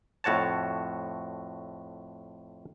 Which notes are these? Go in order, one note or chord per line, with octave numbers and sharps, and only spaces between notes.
F2 A2 F#4 C#5 A5